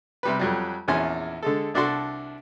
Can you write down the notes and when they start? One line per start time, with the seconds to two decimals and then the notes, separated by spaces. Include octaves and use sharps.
0.23 C3 G3 B4
0.39 F2 F#3 G3
0.88 A#1 E2 C#4 G#5 C6
1.43 D3 G#3 A4
1.74 C2 D4 F#4 A4 C6